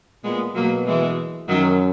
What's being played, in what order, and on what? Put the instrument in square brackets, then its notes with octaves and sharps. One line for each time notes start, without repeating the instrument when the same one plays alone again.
[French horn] A#2 [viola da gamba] G#3 B3
[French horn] B2 [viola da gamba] F#3 A#3
[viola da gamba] E3 G#3
[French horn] F#2 [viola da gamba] D#3 F#3